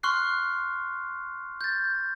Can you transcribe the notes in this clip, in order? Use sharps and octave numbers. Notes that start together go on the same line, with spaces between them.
C6 C#6 F6 F#6 C7
G6 A6